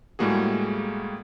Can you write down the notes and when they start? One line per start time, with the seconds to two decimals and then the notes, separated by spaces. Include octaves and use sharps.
0.19 A2 G3 G#3 A#3 F#4 G#4